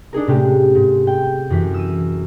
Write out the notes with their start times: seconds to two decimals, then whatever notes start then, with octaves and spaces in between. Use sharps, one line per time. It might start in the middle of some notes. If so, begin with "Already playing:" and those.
0.13 D4 D#4 G#4 A#4
0.27 A2 C3 G#3 A3 C#4 G4
0.75 G#2
1.07 G5
1.50 F#2 E3 B6
1.74 E6 D#7